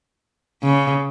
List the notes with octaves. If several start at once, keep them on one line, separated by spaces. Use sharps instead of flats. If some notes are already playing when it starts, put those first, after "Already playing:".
C#3